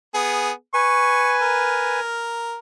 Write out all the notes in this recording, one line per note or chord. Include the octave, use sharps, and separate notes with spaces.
B3 G#4
B4 G#5 C#6
A#4